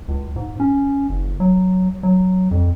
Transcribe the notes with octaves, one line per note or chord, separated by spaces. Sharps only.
C#2
G#2
C#4
F#1
F#3
F#3
F2